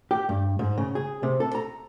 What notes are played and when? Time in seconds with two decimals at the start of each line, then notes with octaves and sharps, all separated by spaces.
0.11 G4
0.29 G2
0.59 G#2
0.78 C#3
0.95 G#4
1.23 C3
1.40 A4
1.55 A#5